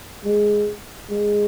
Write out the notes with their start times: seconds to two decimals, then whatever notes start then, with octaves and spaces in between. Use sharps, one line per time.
0.25 G#3
1.10 G#3